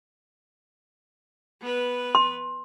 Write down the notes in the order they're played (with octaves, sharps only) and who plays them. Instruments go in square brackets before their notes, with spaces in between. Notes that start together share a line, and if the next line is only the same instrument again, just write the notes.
[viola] B3 B4
[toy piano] C6